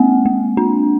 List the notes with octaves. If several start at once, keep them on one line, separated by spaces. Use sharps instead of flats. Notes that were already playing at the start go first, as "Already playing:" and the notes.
Already playing: G#3 A#3 C4
A#3
D4